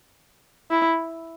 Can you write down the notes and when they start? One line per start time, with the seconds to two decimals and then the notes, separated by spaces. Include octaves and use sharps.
0.71 E4